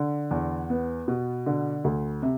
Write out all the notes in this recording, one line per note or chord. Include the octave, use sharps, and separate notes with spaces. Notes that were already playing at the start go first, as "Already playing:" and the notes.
Already playing: D3
E2
B3
B2
D3
D2
C3